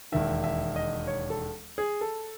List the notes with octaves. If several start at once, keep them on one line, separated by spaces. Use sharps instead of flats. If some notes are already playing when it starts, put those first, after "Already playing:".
E1 D#2 D#3 E5
E5
D#5
C#5
A4
G#4
A4